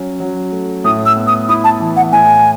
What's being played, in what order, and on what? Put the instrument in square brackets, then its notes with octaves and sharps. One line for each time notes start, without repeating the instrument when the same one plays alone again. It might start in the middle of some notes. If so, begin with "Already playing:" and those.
Already playing: [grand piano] F#3 C#4
F#3
A3
[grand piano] A2 [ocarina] D#6
[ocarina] E6
[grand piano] B3
[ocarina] D#6
[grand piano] E4 [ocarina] D#6
[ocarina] A5
[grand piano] E3
[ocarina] F#5
[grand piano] A2 [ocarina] G#5